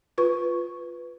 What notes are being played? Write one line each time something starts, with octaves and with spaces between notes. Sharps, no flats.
F4 B4 C#6